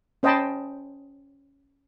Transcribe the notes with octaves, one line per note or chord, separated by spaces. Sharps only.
C#4 C5 D#5 G5 A5 B5